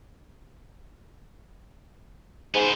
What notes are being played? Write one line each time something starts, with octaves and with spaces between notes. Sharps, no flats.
G#2 B3 C5